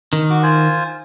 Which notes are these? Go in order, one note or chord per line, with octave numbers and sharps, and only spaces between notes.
D#3
F#4 D6
F4 C5 G#5